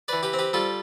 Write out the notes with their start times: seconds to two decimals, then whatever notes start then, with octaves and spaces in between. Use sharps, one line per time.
0.08 E3 B4 D5
0.23 G4 B4
0.33 C4
0.39 G4 B4
0.53 G3 F4 A4